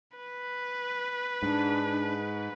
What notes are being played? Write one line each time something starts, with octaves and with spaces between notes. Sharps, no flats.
B4
G#2 D4